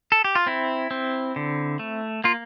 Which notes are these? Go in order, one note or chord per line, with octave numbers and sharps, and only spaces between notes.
A4
G4
F4
C4 E4
C4
D3
A3
A#3 F4